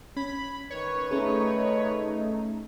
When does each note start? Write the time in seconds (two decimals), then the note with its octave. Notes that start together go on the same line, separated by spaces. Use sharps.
0.17 C#4 B5
0.70 D#3 B4 C#5
1.11 A3 C#4 D#4 G#4